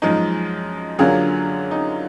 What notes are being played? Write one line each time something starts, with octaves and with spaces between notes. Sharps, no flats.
F#2 F3 G#3 D#4
F#2 D3 F#3 A#3 F4 G#4
D#4